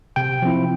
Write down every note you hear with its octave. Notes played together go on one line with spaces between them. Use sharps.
C3 G5
F3 C4 E4